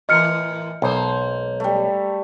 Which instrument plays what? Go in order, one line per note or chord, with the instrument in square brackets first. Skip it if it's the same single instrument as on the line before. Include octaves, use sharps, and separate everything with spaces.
[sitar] A2 E3 A#4 [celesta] D#5 F6 C#7
[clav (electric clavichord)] B1 [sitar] G#3 A#3 C5
[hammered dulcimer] G3 A3